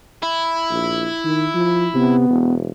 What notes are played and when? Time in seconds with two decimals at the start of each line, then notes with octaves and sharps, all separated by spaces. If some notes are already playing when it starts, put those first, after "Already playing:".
0.23 E4
0.70 A#1
1.25 D#3
1.54 F3
1.94 C3 B3
2.30 E1